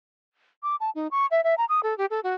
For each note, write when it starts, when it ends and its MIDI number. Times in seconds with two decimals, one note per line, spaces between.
0.63 0.76 86
0.80 0.90 81
0.95 1.08 63
1.11 1.26 85
1.31 1.41 76
1.44 1.55 76
1.58 1.65 82
1.69 1.80 87
1.83 1.96 69
1.98 2.06 67
2.10 2.20 69
2.24 2.35 66